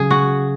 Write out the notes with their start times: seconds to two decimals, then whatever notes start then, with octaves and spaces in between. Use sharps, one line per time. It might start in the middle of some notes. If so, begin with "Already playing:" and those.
Already playing: C#3 F#3 G#4
0.11 F#4